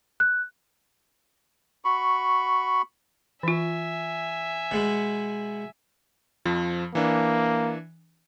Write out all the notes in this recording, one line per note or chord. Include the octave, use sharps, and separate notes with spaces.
F#6
F#4 B5 C#6
E3 F4 E5 G#5
B2 G#3 B3
F2 F3
E3 A#3 D4